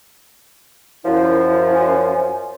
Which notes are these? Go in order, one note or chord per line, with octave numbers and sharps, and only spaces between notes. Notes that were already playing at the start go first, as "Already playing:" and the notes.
F#2 F3 E4
G#5